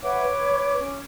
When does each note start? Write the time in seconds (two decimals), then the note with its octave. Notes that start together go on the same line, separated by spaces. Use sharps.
0.03 B4 C#5 E5 F#5 D6
0.29 B4
0.78 C#4 C#5